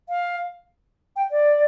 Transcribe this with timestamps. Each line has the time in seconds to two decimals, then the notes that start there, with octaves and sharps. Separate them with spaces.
0.09 F5
1.16 G5
1.31 D5